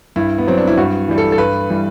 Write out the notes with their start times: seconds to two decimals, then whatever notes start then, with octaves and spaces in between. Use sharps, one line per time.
0.16 G2 E4
0.38 B3
0.47 F#3 C4
0.57 D4
0.67 E4
0.77 G2 F#4
1.08 E3 G3
1.18 A4
1.32 A4
1.38 G2 B4
1.69 E3 G3